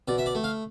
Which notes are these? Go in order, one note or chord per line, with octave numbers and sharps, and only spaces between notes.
B2 D5
E5
D5
A3
F5